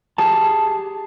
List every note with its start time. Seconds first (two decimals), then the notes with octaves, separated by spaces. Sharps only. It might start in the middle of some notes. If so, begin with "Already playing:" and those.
0.18 G4 G#4 A5